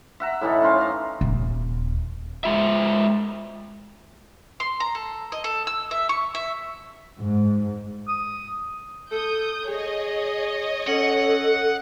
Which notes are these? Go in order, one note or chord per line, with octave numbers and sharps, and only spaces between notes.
E5 F#5 A#5
A2 E3 D#4 A4
C#4 A#4 C5 F5
F5 A#5
D#1
G#3 F4 E5
C6
A#5
A4
D#5
A4
E6
E5
C#6
E5
G#2
D#6
A4 D#6 G6
G#4 C#5 D#5
C#4 A4 F#5